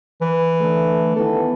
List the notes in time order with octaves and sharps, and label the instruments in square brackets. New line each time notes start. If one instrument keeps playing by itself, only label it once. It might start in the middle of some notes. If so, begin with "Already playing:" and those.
[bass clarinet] E3
[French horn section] D3 A3
[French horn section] D#3 E3 B3 [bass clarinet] A4